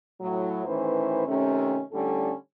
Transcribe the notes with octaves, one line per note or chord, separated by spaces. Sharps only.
A2 F#3
A2 D#3 E3 C#4 B4 C5
C3 D#3 A3 C#4
A2 D3 G3 C#4 A4